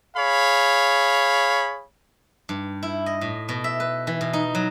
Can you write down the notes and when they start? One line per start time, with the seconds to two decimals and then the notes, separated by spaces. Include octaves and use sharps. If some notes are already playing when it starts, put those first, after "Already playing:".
0.17 G#4 C#5 F5 B5
2.49 G2
2.83 E4
3.06 D#5
3.21 A2
3.49 B2
3.64 E5
3.80 B4
4.07 E3
4.21 B2
4.33 D#4
4.55 F#3